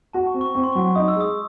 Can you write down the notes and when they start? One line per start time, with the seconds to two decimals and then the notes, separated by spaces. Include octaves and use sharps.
0.13 F#4 A5
0.27 C#6
0.34 C4
0.41 C#6
0.55 C4 C#6
0.64 C6
0.72 F#3 C#6
0.95 D#4 D#6
1.08 E6
1.16 G#3 D#6